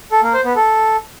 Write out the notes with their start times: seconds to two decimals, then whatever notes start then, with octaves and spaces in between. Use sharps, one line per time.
0.12 A4
0.23 A#3
0.34 C5
0.45 B3
0.56 A4